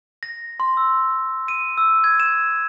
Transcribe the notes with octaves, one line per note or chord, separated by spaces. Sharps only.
A#6
C6
E6
D#7
E6
G#6
E7